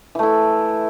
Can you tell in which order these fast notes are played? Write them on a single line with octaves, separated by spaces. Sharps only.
E3 A3 E4